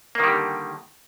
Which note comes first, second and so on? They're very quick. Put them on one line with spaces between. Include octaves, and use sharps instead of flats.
A#3 D#3 G3 D3